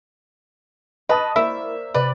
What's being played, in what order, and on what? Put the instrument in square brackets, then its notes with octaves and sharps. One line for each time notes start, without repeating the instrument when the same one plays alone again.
[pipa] B4 [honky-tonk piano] D#5 A5 D#6 [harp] C#6
[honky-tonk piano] A#3 [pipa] E4 [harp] C5 D5 [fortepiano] E5
[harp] C3 [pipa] B4 [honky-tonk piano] D5